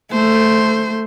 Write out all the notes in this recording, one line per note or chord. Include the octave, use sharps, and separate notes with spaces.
A3 C5